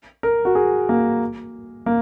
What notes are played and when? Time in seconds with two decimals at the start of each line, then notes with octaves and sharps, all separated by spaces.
0.23 A#4
0.45 F#4
0.55 G#4
0.89 A#3
1.86 A#3